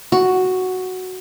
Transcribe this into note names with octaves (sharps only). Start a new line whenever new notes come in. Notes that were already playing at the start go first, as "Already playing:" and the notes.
F#4